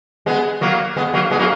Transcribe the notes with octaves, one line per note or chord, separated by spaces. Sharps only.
G#3 B3
F#3 A#3
G#3 B3
F#3 A#3
G#3 B3
F#3 A#3